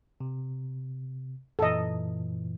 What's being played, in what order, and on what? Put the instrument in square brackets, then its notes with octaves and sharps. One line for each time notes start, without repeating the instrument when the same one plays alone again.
[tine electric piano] C3
[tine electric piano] F#2 A#2 E3 [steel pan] A4 D#5